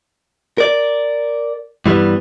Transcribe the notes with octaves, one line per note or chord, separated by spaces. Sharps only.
A#4 D5
G2 E3 G3 B3